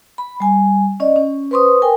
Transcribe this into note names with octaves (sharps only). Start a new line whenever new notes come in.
B5
G3 G#5
C#4 D5 D#5
C#4
B4 C5 C6 C#6 D#6
A#4 G5 G#5